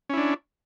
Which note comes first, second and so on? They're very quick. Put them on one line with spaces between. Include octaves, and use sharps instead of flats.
C#4 E4 D4